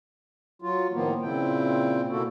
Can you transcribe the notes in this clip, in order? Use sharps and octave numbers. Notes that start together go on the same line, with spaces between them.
F#3 F4
A2 D#3 F3 A#3 B3
A#2 C#3 C4 E4 G5
B2 A#3 E4 F#4 A4